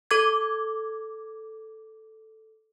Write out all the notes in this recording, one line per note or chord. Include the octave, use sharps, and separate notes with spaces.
A4 D6 G#6